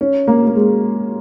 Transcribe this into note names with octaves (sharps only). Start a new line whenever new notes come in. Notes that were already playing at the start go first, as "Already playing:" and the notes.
C#4
A#3
A#3
G#3